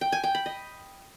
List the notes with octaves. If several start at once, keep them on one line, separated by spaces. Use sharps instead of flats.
G5
G#5
G5
B5
D#5